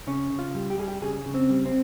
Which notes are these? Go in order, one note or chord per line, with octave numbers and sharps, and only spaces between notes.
C#3 C#4
C#3
F4
G3
G4
G3 G#4
G4
C#3 G#4
C#3
C4
G3
C4